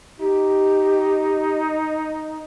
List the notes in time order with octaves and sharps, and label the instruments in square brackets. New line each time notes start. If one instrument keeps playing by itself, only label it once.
[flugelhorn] D#4 [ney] G4